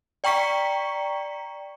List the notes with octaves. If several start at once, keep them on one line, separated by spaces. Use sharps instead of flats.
D5 G5 A#5 C#6 B6 C#7